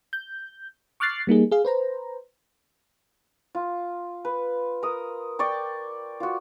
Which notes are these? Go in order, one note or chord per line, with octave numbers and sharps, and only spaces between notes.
G6
C#6 D6 F6 F#6 A6 C7
G3 A#3 D#4 G#4
G#4 F5
B4 C5 A#5
F4
B4
A#4 D#6
D5 G5 C#6
F4 F#4